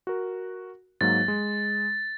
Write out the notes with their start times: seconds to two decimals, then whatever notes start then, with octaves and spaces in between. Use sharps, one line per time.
0.07 F#4 A#4
1.01 G#2 F#3 A#3 A6
1.28 G#3